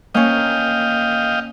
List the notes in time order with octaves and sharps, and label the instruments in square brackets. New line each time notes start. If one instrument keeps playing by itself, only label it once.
[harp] A#3 C#4 [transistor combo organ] D#5 F5 G5